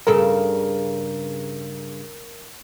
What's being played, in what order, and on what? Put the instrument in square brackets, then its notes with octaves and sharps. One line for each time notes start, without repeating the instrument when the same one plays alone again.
[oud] G2 C#3 A4 [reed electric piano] A#4